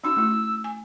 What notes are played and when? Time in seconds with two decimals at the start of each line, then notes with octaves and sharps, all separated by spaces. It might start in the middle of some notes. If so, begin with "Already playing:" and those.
0.04 C#4 D#4 F#4 E6
0.17 A3 E4
0.64 G#5